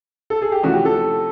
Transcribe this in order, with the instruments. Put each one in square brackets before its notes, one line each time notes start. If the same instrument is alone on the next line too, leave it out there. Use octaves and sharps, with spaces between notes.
[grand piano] A4
G#4
G4
[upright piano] C3 F3 A3 C#4 E4 [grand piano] F#4
[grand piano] G4
A4